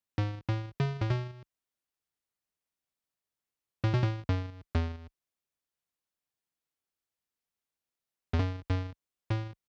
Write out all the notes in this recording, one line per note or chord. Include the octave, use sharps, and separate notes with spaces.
G#2
A2
C#3
A2
B2
A2
B2
A2
F#2
E2
E2
F#2
F#2
A2